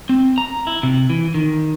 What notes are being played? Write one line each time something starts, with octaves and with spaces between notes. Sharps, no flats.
C4
A#5
E4
C3
E3
D#3